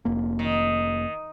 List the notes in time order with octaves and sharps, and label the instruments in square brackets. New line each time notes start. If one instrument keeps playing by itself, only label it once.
[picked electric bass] F1 A#3
[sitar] D#3